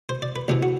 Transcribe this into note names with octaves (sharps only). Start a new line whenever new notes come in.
C5
D5
B4
D2 C3 E3 G4
F#4